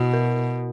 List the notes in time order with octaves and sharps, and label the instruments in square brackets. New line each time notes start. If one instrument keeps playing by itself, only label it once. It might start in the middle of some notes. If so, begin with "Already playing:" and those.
Already playing: [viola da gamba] B2 [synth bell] E4 F#4
[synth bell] A#4